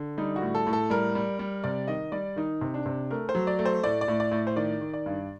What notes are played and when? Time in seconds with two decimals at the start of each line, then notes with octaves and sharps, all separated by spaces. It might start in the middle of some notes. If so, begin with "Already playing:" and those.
Already playing: D3
0.18 G3 D#4
0.36 F#4
0.42 A2
0.55 A4
0.67 A2
0.73 A4
0.90 G3 A#4
1.15 G3
1.39 G3
1.64 C3 D5
1.88 D#3 D#5
2.12 G3 D5
2.36 D#3 D#4
2.61 C3
2.74 D4
2.86 C3
3.11 A3 A#4
3.29 C5
3.35 F#3
3.47 D5
3.59 A3
3.65 C5
3.84 A2 D5
4.01 D5
4.08 A2
4.20 D5
4.32 A2
4.47 C5
4.56 D#3 D5
4.81 D#3
4.93 D5
5.06 G2